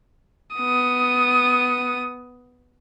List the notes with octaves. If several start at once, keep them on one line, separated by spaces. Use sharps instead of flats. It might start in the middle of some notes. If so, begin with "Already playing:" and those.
B3 D#6